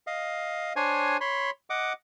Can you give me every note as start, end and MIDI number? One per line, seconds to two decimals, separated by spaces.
0.07 0.73 75
0.07 0.73 77
0.76 1.17 62
0.76 1.17 72
0.76 1.17 73
0.76 1.17 80
1.21 1.50 73
1.21 1.50 83
1.21 1.50 84
1.70 1.93 75
1.70 1.93 78
1.70 1.93 86